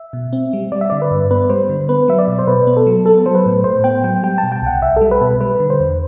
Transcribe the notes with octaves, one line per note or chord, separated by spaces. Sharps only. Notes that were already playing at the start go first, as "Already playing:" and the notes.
Already playing: E5
B2
C4
G3
G3 D5
E5
D3 D5
B4
G2
B3 B4
G3 C5
D3
B3 B4
F#3 E5
D5
B2
C5
B2 B4
B3
A4
F#3
B3 A4
F#3 C5
B4
A2
A2 C5
B3 G5
F#3 G5
G3 G5
A5
B2
G5
C2 F#5
C2 E5
G3 A4
B4
B2
G3 B4
D3
C5
E2